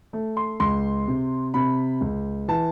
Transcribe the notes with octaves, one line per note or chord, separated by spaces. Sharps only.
A3
C6
C#2 C6
C3
C3 B5
C#2
E3 A5